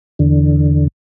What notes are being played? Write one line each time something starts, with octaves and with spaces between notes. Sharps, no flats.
E2 D3